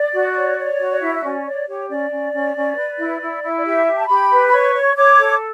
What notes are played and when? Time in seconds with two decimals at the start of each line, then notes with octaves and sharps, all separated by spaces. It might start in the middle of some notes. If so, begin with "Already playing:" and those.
Already playing: D5
0.14 F#4
0.35 C#5
0.58 C#5
0.80 F#4
0.92 D5
1.01 E4 E5
1.15 E5
1.23 C#4 D5
1.45 C#5 D5
1.67 G4 C#5
1.89 C#4 D5
2.11 C#4
2.33 C#4
2.56 C#4
2.77 B4
2.99 E4
3.21 E4
3.43 E4
3.56 D5
3.65 G4 E5
3.86 G4
3.99 A5
4.08 G4 B5
4.31 B4
4.49 B5
4.52 C#5 C#6
4.75 C#5
4.96 C#5 D6
5.18 A4